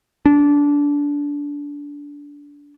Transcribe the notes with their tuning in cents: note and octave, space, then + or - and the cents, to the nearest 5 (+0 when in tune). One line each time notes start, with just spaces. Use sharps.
D4 -20